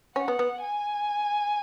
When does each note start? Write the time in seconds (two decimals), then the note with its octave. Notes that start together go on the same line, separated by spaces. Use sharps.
0.16 C#4 F#5
0.28 B3
0.39 B3
0.63 G#5